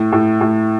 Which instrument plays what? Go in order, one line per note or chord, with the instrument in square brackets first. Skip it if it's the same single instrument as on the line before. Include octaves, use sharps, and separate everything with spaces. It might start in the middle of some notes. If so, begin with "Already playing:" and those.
Already playing: [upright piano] A2
A2
A2